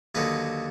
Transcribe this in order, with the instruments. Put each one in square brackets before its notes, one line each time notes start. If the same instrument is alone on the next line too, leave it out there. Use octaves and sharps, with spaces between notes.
[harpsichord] D#2 D3 F#3 B4 D#5